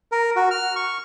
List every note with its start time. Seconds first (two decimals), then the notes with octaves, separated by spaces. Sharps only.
0.12 A#4
0.36 F#4
0.51 F6
0.76 C#6